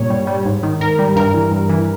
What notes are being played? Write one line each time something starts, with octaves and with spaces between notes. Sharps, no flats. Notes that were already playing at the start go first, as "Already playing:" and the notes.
Already playing: G2 A#2 G3 C#5
G3
G3
G#2
D#3
G#2 A#4
G3
G2 A#4
E3
G2
E3